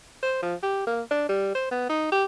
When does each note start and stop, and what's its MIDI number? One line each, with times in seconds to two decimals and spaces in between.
0.23 0.41 72
0.42 0.55 53
0.63 0.84 67
0.87 1.02 58
1.11 1.27 62
1.29 1.53 55
1.55 1.68 72
1.71 1.85 59
1.89 2.08 63
2.12 2.25 67